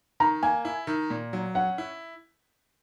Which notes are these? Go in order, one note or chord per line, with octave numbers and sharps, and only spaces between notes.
D#3 A#5
A#3 G#5
E4
D#3
A#2
F#3
C#4 F#5
E4